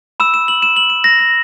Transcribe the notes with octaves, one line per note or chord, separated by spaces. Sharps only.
B5 E6 E7
E7
F#7
E7
F#7
E7
A#6
A#6